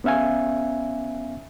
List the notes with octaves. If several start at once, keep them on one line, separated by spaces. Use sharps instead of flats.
B3 C#4 E5 F5 G#5